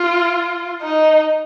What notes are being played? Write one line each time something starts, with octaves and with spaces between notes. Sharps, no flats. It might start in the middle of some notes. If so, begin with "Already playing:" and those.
Already playing: F4
D#4